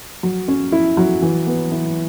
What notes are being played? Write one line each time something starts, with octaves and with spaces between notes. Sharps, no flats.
F#3
C#4
E4
F#3
E3
B3
E4